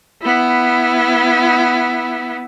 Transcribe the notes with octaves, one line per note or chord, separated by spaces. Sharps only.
B3 E4